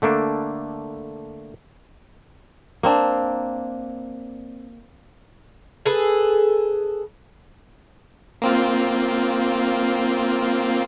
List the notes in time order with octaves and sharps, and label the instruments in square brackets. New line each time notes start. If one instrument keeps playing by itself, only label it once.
[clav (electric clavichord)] D3 A3 A#3 D4
[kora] A#3 C4 D4
[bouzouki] G#4 A4 B4
[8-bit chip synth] A#3 C4 F4